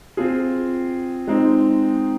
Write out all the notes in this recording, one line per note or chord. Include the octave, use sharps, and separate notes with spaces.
C4 F4 G#4
G#3 C4 D#4